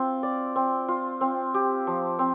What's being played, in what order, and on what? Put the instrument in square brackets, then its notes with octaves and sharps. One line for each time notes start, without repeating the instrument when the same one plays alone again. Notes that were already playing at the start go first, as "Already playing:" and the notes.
Already playing: [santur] C4 F4
D5
C4
F4
C4
G4
F3
C4